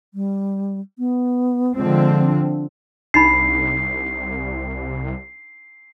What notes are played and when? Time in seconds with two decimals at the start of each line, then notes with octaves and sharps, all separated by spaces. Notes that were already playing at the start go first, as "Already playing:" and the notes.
0.14 G3
0.98 B3
1.76 D3 F3 G#3 C4
2.26 D4
3.14 C2 D4 D#4 B5 C7